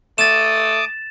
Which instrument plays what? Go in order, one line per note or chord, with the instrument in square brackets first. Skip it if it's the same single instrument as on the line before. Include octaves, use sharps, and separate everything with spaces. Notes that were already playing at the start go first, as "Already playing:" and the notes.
[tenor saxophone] A3 [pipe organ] A5 D6 D#6 [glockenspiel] A6 E7